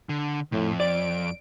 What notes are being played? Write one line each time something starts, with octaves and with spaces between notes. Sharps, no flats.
D3
F2 A2
D5 D7